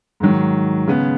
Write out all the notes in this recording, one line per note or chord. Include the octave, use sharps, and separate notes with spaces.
G#2 D#3 F#3
C#3 G#3 B3